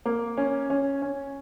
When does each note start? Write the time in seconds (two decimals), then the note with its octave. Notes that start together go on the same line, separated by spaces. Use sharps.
0.05 A#3
0.37 C#4
0.70 C#4
1.02 C#4